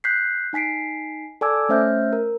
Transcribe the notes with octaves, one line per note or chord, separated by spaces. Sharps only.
F#6 G6 B6 C7
D#4 G#5 B6 C7 D7
A4 D5 G#5 D6 E6 G#6
A3 C#4 C5 E5 F6 G6
A#4